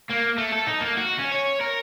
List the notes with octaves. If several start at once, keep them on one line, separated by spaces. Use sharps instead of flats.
A#3
A3
A4
D#4
A#3
F#4
C#4
C#5
A#4